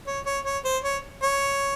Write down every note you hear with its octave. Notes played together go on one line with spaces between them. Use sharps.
C#5
C#5
C#5
C5
C#5
C#5